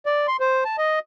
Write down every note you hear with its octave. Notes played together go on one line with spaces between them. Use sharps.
D5
C6
C5
A5
D#5